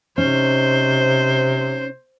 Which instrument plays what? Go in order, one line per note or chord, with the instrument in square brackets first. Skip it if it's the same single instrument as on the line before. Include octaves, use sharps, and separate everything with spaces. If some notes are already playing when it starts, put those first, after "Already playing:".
[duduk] C3 [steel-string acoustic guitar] C#4 D#4 [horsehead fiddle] C5